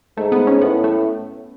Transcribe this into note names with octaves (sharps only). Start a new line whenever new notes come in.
G#2 A3
B3
C#4
A2 B3
A3